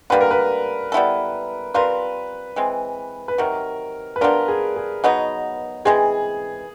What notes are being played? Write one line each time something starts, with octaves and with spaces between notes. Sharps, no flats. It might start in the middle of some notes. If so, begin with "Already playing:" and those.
D3 G3 A#3 B4
A#4
B4
G3 B3 E4 A4
G3 C4 F4 A#4 B4
E3 G#3 C4
B4
C3 D#3 F#3 A#4
B4
G3 B3 D4 F4 A#4
G#4
G#4
B2 F#3 B3 D#4
E3 G#3 C4 G#4